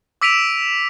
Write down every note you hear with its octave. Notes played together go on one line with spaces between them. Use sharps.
D6 E6 B6 D7 D#7 F7